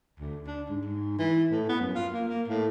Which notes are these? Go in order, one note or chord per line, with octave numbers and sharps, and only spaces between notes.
D2
D4
G#2
G#2
E3
A2
B3
F#2
F4
A#3
A#3
A2